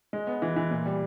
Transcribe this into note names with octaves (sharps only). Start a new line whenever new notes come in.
G#3
B3
E3
E3
A#2
G3